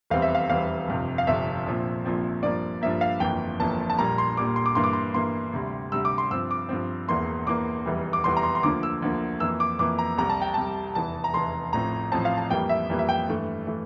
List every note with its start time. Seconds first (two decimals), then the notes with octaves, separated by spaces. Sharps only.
0.10 F1 E2 E3 G3 C4 F5
0.22 E5
0.35 F5
0.49 F1 E2 E3 G3 C4 F5
0.88 G1 F2 C3
1.18 F5
1.27 G1 F2 C3 E5
1.66 A#1 A#2 F3 C4
2.05 A#1 A#2 F3 C4
2.43 G2 F3 A#3 D5
2.81 G2 F3 A#3 E5
3.01 F5
3.20 G1 F2 E3 A#3 G5
3.60 G1 F2 E3 A#3 A5
3.90 A5
3.98 A#1 A#2 G3 A#3 A#5
4.18 C6
4.37 A#1 A#2 G3 A#3 D6
4.56 C6
4.66 D6
4.75 G2 E3 A#3 C6
4.84 D6
4.93 C6
5.14 G2 E3 A#3 C6
5.53 D2 C3 G3
5.92 D2 C3 G3 E6
6.05 D6
6.18 C6
6.31 G2 F3 C4 E6
6.51 D6
6.69 G2 F3 C4
7.08 E1 E2 E3 A#3 C6
7.46 E1 E2 E3 A#3 D6
7.85 F1 E2 E3 G3
8.13 D6
8.24 F1 E2 E3 G3 C6
8.37 A#5
8.43 C6
8.55 C6
8.63 D2 D3 F3 A#3 D6
8.83 E6
9.02 D2 D3 F3 A#3
9.40 F2 E3 A#3 E6
9.60 D6
9.79 F2 E3 A#3 D6
9.99 A#5
10.18 C2 C3 G3 A#5
10.29 A5
10.41 G5
10.54 C2 C3 G3 A5
10.95 F1 E2 E3 A5
11.24 A#5
11.34 F1 E2 E3 C6
11.73 A1 A2 F3 C4 A#5
12.12 A1 A2 F3 C4 A5
12.25 F5
12.38 A5
12.50 F2 E3 G3 A#3 G5
12.69 E5
12.90 F2 E3 G3 A#3
12.99 E5
13.09 G5
13.28 G2 E3 A3
13.67 E3 A3